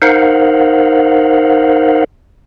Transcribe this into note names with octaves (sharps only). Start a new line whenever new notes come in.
D#4 A#4 C5 F5 F#5